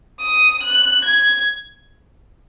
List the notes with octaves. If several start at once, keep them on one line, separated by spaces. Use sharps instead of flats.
D#6
F#6
G#6